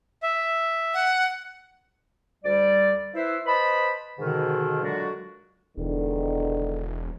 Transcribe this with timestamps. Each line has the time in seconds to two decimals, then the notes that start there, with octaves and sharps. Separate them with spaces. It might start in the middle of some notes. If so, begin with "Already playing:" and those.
0.23 E5
0.94 F#5
2.44 D2 G3 D5
3.14 E4 B4 C5 E5
3.46 B4 C5 D#5 A5 B5
4.19 G#2 B2 D3 D#3
4.82 A#2 D3 F#3 G#3 D4 F#4
5.77 E1 E2 D3 D#3